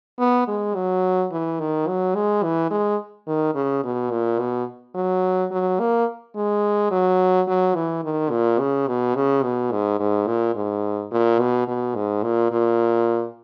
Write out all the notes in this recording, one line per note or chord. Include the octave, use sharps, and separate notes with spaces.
B3
G#3
F#3
E3
D#3
F#3
G#3
E3
G#3
D#3
C#3
B2
A#2
B2
F#3
F#3
A#3
G#3
F#3
F#3
E3
D#3
A#2
C#3
B2
C#3
B2
G#2
G#2
A#2
G#2
A#2
B2
B2
G#2
A#2
A#2